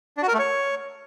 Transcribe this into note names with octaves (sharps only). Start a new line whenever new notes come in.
D4
F#4
A#4
A3
C#5